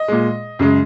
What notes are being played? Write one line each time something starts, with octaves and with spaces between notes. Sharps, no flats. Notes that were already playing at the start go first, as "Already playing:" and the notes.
Already playing: D#5
A#2 G#3
F#2 C#3 G#3